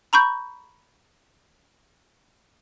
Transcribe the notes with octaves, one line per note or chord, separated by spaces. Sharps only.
A#5 B5 C#6 G6